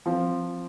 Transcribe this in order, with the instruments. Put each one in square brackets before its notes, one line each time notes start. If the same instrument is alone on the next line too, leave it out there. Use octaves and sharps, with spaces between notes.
[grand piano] F3 C4 F4